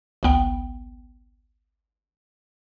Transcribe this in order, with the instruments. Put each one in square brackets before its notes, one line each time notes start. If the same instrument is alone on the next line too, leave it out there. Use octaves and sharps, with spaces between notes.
[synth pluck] G#1 C#2 B3 G5